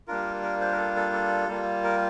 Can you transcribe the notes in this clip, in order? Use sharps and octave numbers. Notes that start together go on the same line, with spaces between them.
G3 A#3 D4 F4 A#4
A#4
C5
A#4
A4
A4
A4
G3 A#3 F4
A#4